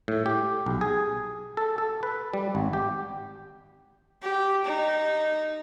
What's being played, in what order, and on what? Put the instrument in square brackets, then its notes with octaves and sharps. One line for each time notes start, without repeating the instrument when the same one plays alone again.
[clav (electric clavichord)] A2
G4
B1
G#4
A4
A4
B4
G3
G#1
G4
[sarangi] G4
D#4